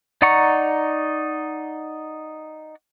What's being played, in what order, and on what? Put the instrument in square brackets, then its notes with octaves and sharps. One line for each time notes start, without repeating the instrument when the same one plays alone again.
[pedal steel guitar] D#4 D5 F#5 A#5 C#6